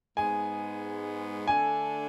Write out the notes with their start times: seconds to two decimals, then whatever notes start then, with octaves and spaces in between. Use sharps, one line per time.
0.17 G#2 G#3 B3 G#5
1.47 D3 A3 D4 A4 G#5